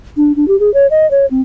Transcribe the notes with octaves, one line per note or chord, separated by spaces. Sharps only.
D4
D4
G4
G#4
C#5
D#5
C#5
C4